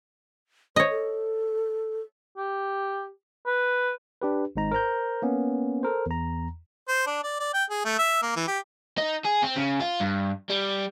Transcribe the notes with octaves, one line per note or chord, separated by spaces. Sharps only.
C5 C#5 D#5
A4
G4
B4
D4 G4 B4
G#1 G#2 D#4 A#5
A#4 C5 A#5 G6
A#3 B3 C#4
A4 A#4 C5
E2 A#5
C5
D4
D5
D5
G5
G#4
A3
E5
A#3
E3
G4
D#4
G#4
C4
C#3
F4
G2
G3